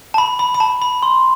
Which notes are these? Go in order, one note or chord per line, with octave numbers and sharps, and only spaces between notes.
A5
B5
B5
B5
A5
B5
C6